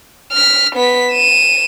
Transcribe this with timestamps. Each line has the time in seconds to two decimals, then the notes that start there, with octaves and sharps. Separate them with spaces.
0.33 F6 B6
0.76 B3 B6
1.12 D#7 E7